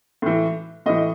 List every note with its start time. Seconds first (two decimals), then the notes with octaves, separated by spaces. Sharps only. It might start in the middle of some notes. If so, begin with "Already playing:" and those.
0.22 A2 E3
0.86 A2 E3 D#5